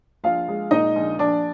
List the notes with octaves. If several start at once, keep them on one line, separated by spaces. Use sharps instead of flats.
A#1 F4 F5
G#3
A#2 D#4 D#5
A#1
A#1 D4 D5